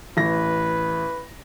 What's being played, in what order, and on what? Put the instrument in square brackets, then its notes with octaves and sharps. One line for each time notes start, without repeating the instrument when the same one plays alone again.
[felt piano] A1 A#6 [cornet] B4